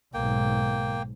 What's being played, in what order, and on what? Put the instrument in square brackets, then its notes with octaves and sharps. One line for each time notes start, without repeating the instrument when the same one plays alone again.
[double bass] B1 G#2 [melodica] A#3 G5